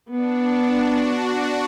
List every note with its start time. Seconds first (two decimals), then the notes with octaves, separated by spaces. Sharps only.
0.10 B3 D4
0.76 F#4